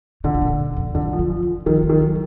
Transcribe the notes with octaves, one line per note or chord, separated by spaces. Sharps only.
A#2 D3
B2
A#2
G#2
F2
F#2 D3
F3
D3
F3
D#3
D#3 F3
G#3
D#3
F#3